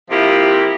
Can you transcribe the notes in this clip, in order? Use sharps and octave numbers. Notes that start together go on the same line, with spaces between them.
C3 F3 A#3 E4 G4